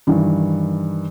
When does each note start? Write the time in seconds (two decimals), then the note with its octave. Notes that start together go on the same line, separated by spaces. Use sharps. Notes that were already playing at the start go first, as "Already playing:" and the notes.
0.07 G2 D#3 E3